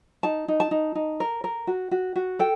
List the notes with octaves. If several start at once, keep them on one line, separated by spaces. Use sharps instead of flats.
D#4 A5
D#4
A5
D#4
D#4
A#4
A#4
F#4
F#4
F#4
A4 G5